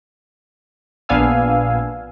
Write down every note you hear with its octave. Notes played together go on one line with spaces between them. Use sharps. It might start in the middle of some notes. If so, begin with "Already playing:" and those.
A#1 B3 D4 F5 G#5 E6